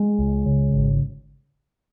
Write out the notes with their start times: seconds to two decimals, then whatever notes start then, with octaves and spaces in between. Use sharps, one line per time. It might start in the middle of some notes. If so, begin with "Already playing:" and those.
Already playing: G#3
0.19 C#2
0.46 C#3
0.74 G#1